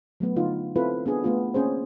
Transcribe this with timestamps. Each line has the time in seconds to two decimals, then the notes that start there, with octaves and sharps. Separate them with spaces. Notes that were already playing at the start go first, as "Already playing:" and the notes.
0.20 F#3 A3 B3
0.36 D3 D#4 F4
0.76 C4 E4 F4 A4 B4
1.06 B3 D4 G#4
1.24 A3 B3 F4
1.54 A#3 C4 C#4 G#4 C5